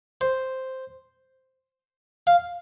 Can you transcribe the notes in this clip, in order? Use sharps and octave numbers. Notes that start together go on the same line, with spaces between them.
C5
F5